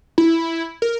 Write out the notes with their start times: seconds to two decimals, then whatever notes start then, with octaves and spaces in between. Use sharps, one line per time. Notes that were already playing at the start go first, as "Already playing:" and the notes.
0.18 E4
0.82 A#4